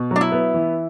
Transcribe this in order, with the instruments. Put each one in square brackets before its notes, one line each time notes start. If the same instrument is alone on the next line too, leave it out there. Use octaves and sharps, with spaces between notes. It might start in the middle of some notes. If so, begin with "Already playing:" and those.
Already playing: [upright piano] B2
[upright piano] F#3 [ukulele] D4
[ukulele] E4
[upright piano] B3
E3